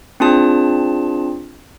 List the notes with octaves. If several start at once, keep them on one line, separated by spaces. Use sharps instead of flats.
C4 D4 F4 G#4 A5